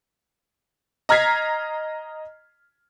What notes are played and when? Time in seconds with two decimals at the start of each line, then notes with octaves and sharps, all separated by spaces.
1.09 D#5 A#5 F6 G#6 B6 C7